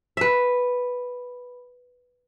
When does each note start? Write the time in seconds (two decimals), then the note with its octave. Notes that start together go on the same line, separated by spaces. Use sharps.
0.17 B4 E5